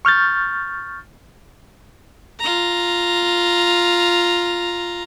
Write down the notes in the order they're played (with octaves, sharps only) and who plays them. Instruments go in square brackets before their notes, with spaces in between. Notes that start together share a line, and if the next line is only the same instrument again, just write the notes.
[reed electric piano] C#6 F6 G6 A6
[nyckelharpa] F4 A#5